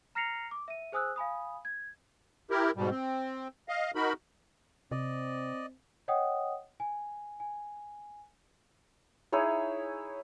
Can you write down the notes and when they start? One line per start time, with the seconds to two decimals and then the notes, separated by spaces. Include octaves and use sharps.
0.15 A#5 F6 A#6 C7 C#7 F7
0.51 D6
0.68 E5 D#7
0.92 G#4 C5 G#5 D#6 E6 F#6
1.16 F5 G#5 B5 D#6
1.65 G#6
2.51 E4 G4 A#4
2.76 G#2 B2 G3
2.91 C4
3.69 D#5 F5
3.95 D#4 F#4 A#4 B5
4.91 C3 C4 D5 D#5
6.08 C#5 D#5 F#5 G5 D#6
6.80 G#5
7.40 G#5
9.32 D#4 E4 G#4 C#5